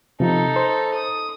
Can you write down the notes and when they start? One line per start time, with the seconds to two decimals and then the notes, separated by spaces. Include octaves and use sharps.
0.20 C3 F3 D#4 A4
0.56 C5
0.94 D#6